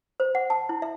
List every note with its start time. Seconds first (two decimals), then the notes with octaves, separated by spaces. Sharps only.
0.20 C5
0.35 F#5
0.50 A5
0.69 E4
0.82 E5